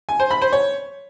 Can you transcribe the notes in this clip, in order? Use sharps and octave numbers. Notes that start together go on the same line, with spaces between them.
G#5
C5
B5
C5
C#5